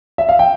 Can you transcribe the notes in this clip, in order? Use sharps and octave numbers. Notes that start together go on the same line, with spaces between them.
E5
F5
G5